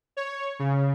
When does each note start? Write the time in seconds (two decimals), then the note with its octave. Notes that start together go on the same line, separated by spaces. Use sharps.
0.17 C#5
0.59 C#3